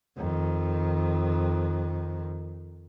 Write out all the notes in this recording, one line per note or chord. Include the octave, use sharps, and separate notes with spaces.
F2 D#3